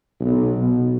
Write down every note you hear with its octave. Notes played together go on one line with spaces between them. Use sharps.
B1
B2